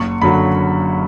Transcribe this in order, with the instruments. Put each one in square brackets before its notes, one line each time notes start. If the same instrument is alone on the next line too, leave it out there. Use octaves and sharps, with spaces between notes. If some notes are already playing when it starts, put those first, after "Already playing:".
Already playing: [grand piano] F#1 C#6
F#2 D3 F#3 B5